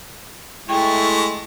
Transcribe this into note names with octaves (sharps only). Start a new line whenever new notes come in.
G#3 A3 E4 G5 C#6